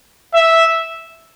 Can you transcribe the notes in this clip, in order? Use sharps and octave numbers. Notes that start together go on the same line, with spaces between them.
E5